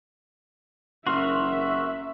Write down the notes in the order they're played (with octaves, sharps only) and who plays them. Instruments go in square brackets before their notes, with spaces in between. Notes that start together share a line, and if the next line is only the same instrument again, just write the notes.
[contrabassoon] F#1 [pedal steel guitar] F#4 A#4 F6 [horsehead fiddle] E5 [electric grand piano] C6